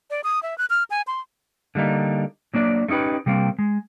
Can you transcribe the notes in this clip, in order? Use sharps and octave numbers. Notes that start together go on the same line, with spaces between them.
D5
D#6
E5
F#6
F6
G#5
C6
D3 G3 A#3 D#4
F#3 A#3 D4 D5
A3 C#4 D#4 G4 B4
C3 G3 A#3 C4
G#3